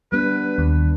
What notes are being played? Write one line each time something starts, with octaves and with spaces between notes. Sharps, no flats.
G3 B3 D4 B4
D#2